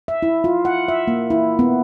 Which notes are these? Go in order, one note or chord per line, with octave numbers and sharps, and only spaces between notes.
E5
E4
F4
F#5
E5
A#3
E4
B3